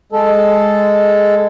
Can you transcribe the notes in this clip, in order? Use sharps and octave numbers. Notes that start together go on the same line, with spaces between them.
G#3 A4